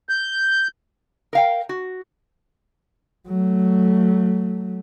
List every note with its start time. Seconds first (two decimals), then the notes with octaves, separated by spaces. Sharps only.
0.09 G6
1.33 A#4 F5 G5
1.69 F#4
3.28 F#3 A3